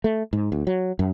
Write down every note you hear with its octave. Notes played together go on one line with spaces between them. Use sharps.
A3
G#2
D2
F#3
F#2